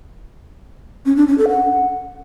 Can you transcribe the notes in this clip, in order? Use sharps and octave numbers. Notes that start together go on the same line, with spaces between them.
C#4
D4
C#4
A4
F#5